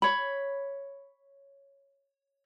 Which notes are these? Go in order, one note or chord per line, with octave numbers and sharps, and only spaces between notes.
C#5 B5